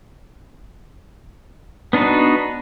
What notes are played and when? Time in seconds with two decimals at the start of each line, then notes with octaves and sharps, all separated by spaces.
1.93 B3 D4 D#4 F#4 B4